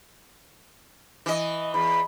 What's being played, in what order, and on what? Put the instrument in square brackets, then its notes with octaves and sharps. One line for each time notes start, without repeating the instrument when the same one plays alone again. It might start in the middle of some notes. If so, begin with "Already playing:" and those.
[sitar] E3 D#5
[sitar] E2 [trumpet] B5